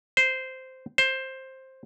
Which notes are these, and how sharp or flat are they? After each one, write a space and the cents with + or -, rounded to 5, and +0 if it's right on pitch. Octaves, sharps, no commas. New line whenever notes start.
C5 -10
C5 +10